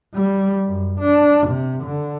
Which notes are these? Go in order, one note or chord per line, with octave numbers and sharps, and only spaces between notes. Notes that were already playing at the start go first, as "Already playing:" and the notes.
G3
F#2
D4
C3
D3